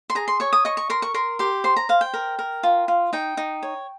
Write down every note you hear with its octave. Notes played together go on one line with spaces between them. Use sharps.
C6
G#4 A#5
C6
C#5 C#6
D#6
D#5 C#6
C#6
A#4 C6
C#6
A#4 C6
G4 C6
C5 C6
A#5
C5 F5
G5
A#4
A#4
F4
F4
D#4 G5
D#4
C#5